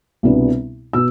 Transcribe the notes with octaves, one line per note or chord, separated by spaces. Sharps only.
C2 B2 G3 B3 D4
B2 E6